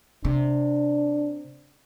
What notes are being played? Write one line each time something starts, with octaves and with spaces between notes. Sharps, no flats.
C3 D4